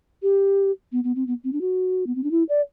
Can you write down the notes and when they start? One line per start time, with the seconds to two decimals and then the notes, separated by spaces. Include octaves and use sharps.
0.23 G4
0.92 B3
1.04 B3
1.16 C4
1.27 B3
1.44 C4
1.53 D4
1.61 F#4
2.07 B3
2.16 C4
2.24 D4
2.31 E4
2.49 D5